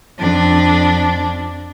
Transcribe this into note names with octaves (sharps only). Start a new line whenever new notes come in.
F2 D4